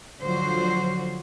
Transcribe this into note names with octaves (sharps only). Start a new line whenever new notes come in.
D3 F3 F#3 F4 F#4 C5